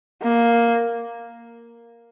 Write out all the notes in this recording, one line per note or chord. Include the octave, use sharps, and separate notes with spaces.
A#3